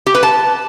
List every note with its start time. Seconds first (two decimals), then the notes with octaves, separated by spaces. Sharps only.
0.07 G4
0.15 B4
0.23 A5